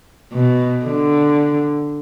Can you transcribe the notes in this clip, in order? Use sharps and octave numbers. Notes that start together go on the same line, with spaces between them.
B2
D3